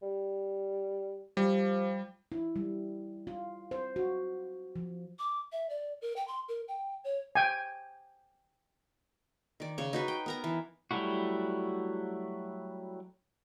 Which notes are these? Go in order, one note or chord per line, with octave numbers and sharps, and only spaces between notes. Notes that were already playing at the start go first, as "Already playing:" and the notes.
G3
F3 G3
E4
G3
F4
C5
F#4
F3
D6
E5
D5
A#4
G5
C6
A#4
G5
C#5
G5 G#5
D#3 D5
C#3 C#5
D#4 F#4 B4
G5
B3 A#4 A#5
E3
F#3 G3 A3 E4 F#4